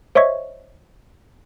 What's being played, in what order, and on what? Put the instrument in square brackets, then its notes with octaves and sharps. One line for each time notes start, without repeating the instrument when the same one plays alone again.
[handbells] C5 C#5 D#5 E5 C#6 G#6